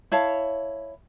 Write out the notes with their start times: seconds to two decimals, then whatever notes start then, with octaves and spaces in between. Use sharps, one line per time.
0.12 E4 C#5 F5 A5